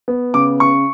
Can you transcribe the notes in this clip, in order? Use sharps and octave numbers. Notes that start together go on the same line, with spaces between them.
B3
C#3 D6
C#3 C#6